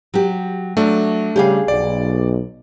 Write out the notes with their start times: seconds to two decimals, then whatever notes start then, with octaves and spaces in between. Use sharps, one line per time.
0.14 F#3 G4
0.77 F#3 A3 D4
1.36 C#3 G3 G4 G#4 F5
1.68 B1 D5